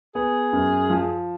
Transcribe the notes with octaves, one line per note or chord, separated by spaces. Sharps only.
B3 G#4
F#2
F3